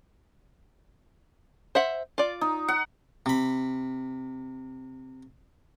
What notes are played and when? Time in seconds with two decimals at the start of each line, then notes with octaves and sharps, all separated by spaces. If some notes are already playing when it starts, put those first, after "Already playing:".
1.75 C5 E5 F#5
2.18 F4 D5
2.41 D#4
2.68 F#5
3.26 C3 B5